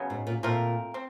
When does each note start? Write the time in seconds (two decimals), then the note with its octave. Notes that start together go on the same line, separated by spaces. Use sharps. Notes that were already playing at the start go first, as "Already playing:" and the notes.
Already playing: C#3 F#3 B3
0.10 G#2
0.27 A#2
0.43 A#2 A3 C4 F4 A#4
0.94 C4